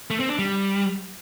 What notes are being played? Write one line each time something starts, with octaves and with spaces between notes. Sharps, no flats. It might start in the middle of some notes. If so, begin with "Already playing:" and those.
A3
C4
D4
G3